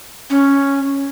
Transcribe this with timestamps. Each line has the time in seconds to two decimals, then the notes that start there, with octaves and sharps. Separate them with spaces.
0.30 C#4